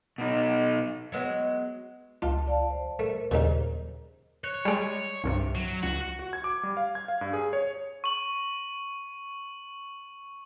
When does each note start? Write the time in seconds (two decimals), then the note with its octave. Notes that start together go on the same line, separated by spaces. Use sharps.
0.18 B2 D#4
1.12 F#3 G#3 B3
2.22 C#2 F4 A5
2.47 D5 F5 A5
2.70 C5
2.99 A3 A#4 C5
3.31 D#2 A#2 C#3 D#4
4.44 C#5 F#6
4.65 G3 G#3
5.24 C2 G2 C3
5.55 F#3
5.83 C#2 F#4
6.19 F#4
6.33 G#6
6.44 D6
6.63 G3
6.77 F5
6.95 G#6
7.08 F5
7.21 G2
7.33 G#4
7.53 C#5
8.04 C#6 F#7